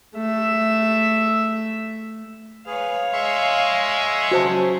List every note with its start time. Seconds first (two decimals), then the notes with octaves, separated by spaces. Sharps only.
0.15 A3 E5
2.66 G#4 B4 C#5 F5
3.13 G#3 E5 C6 C#6
4.31 C#3 F#3 F#4 C5 A5